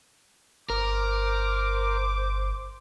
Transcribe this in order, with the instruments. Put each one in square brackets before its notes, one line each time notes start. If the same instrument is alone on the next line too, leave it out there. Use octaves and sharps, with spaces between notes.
[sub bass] G1 [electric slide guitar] A#4 [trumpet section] C5 D6